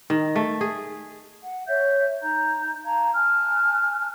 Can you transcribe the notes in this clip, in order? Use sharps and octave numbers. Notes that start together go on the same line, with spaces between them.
D#3
A3
G#4
F#5
C#5 E5 G6
D#4 A#5 G6
F5 A5 A#5 G#6
G#5 A5 F6 F#6